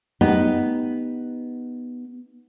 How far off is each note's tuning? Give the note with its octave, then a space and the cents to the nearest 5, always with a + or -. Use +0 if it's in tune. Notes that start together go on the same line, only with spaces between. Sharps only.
B3 +0 D#4 +0 G4 +0